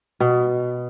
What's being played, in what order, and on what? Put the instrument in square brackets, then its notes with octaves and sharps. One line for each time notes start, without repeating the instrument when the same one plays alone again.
[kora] B2